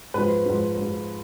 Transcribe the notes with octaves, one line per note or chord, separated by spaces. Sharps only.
G#2 F3 B4
G#2 F3
G#2 F3